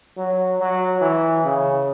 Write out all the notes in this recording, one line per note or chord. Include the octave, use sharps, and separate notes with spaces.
F#3
F#3
E3
C#3